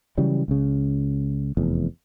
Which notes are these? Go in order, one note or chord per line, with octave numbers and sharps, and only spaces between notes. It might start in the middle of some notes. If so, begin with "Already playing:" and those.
C#3 E3 F#3 G3
C#2 C#3
F1 E2